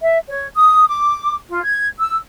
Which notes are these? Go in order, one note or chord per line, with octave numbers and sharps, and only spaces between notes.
E5
C#5
D#6
D6
F4
G#6
E6